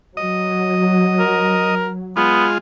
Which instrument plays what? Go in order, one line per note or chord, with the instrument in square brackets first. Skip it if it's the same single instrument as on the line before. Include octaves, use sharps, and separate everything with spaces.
[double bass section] F#3 [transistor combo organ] D#5
[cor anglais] A#4
[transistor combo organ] G#3 F4 [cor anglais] B3